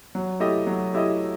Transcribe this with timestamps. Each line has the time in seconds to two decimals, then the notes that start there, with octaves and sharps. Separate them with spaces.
0.15 F#3
0.40 A3 E4 G4 D#5
0.67 F#3
0.93 A3 E4 G4 D#5